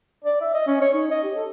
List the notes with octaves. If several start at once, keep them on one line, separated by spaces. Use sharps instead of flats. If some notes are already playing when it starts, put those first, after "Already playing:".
D5
E5
D#5
C#4
C#5
D#4
D#5
G4
A4